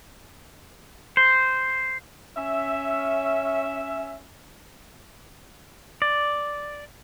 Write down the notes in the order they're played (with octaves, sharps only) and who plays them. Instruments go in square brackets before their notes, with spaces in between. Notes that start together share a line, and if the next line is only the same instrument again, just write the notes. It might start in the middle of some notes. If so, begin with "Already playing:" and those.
[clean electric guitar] C5
[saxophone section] C#4 E5
[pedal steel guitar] D5